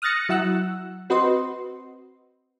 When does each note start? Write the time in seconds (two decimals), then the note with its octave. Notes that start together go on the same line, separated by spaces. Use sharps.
0.02 D#6 F6 F#6 A6 A#6 C#7
0.29 F#3 E4 F#5 E6 F#6
1.10 C4 F#4 B4 D#5 C6